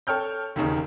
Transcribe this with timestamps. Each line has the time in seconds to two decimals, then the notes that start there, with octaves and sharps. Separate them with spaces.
0.07 A4 C#5 G5 F6 G6
0.56 E1 D#2 C#3 D#4